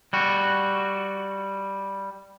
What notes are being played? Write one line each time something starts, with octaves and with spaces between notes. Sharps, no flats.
G3 F#4